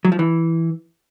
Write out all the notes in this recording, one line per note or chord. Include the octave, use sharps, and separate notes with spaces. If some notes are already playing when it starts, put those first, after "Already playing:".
F#3
F3
E3